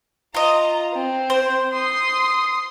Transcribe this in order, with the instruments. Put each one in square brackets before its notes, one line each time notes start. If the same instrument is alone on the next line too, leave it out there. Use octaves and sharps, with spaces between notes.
[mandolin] F4 D#5 [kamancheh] A#5
[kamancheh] C4
[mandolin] C5
[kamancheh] C6 D#6